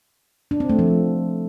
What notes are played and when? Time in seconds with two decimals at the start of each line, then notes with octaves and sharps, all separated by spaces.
0.51 D4
0.60 C4
0.70 A3
0.79 F3